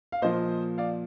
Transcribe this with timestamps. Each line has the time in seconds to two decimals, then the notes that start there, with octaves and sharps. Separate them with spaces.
0.12 F5
0.22 A#2 F3 C5 D#5
0.78 D5 F5